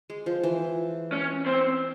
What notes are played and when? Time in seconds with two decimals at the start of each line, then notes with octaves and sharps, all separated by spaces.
0.10 G#3
0.26 F3
0.43 E3
1.12 C#4
1.46 C4